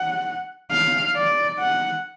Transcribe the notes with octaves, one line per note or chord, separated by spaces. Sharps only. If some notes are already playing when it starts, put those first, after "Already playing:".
Already playing: F#5
F5
D5
F#5